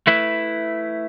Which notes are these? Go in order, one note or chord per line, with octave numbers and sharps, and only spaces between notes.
A3 E4 B4 E5